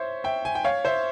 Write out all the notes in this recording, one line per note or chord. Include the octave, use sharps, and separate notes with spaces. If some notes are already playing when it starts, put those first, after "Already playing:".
Already playing: C5 C#5 E5
E5 G5
G#5
G5
C#5 F5
C5 E5